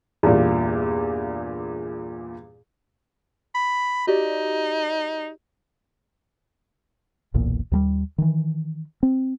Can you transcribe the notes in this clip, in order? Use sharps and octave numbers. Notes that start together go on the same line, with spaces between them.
E2 G2 A#2
B5
D#4 F#4 G4 D5
F#1 B1 E2 A#2
D#2 F#3 G3
D#3 E3
C4